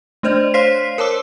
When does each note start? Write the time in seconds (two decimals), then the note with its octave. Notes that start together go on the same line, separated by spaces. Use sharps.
0.23 A3 D4 C5 D5 D#5
0.54 C5 C#5 F5 C6 B6 C7
0.98 A#4 C#5 A5 D6 E6